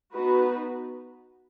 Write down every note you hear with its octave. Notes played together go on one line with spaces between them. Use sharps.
B3 D#4 F#4 B4